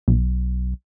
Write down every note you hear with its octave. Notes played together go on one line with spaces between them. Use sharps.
B1